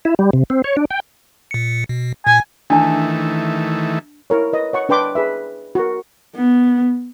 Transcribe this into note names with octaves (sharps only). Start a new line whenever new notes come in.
E4
G3
C3
C4
C#5
D4
G5
A#2 C#7
B2
A#2 G#5 G#6
D#3 E3 A3 D4 A5
E4 A#4 C#5
B4 D#5
C#5 F#5 C#6
D4 B4 G5 C6 D6
G#4 B4 E5
F#4 A#4
B3